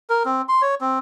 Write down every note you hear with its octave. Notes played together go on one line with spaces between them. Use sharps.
A#4
C4
C6
C#5
C4